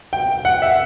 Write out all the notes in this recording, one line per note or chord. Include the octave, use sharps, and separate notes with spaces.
G5
F#5
E5